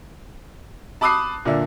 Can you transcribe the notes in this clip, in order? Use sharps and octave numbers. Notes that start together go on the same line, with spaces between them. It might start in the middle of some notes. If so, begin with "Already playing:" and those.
A5 B5 D6 D#6 F#6 C7
A#2 D3 E5